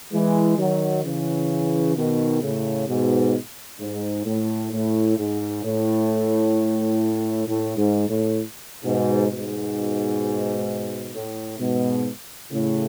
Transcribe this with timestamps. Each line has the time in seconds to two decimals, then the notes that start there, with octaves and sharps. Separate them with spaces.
0.13 E3 G#3
0.58 D#3 F#3
1.04 C#3 E3
1.96 B2 D#3
2.42 A2 C#3
2.88 G#2 B2
3.80 G#2
4.26 A2
4.72 A2
5.18 G#2
5.64 A2
7.48 A2
7.78 G#2
8.08 A2
8.84 G#2 B2
9.30 G#2 B2
11.15 A2
11.60 G#2 B2
12.52 A2 C#3